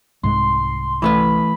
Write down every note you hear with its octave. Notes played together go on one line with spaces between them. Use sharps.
C2 G#2 G#3 C6
E3 A3 B4 B5